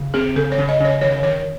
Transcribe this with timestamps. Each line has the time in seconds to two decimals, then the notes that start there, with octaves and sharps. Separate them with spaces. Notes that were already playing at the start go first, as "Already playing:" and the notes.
Already playing: C#3
0.14 C4 G#4
0.36 C#3 A4
0.52 C#5
0.58 C#3
0.69 D#5
0.80 C#3 C#5
1.01 D#3 C#5
1.23 D#3 C#5